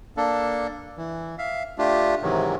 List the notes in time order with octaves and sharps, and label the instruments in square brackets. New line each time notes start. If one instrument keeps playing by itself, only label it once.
[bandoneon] A#3 D4 A4
E3
E5 F5
A3 D4 F4 G4
G#2 C3 D#3 E3 F#3